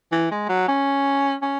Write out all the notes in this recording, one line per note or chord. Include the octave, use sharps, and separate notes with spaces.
E3
G#3
F#3
C#4
C#4